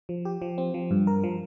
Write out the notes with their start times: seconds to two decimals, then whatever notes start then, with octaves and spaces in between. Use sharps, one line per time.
0.09 F3
0.25 G4
0.42 F3
0.58 C4
0.74 F3
0.91 G2
1.07 A#4
1.23 F3